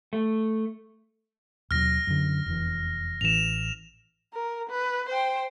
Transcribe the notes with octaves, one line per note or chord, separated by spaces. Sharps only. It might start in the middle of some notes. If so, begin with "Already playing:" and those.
A3
D#2 B2 F#3 F6 A#6
F#2 D3
F1 E2 E3
A1 E3 E7 F7
A#4
B4
C5 G5